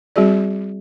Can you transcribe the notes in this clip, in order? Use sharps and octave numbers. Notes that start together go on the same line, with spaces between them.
G3 C4 F#4 G#4 D5